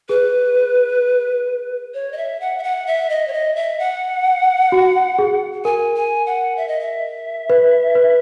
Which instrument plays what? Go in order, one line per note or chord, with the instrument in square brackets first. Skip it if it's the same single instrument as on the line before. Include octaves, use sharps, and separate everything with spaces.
[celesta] G#4 [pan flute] B4
[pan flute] C#5
D#5
E5
F#5
E5
F#5
E5
D#5
C#5
D#5
E5
F#5
[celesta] F#4
G#4
[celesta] A#4 [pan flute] G#5
[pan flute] G#5
F#5
E5
D#5
E5
[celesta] B4
B4